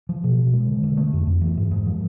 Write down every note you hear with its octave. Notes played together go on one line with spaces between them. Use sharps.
F3
B2
B2
G#3
D3
D3
A3
F2
F2
E3
G#2
G#2
F3